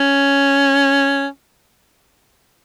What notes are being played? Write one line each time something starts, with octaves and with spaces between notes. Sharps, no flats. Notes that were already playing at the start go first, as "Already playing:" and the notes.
Already playing: C#4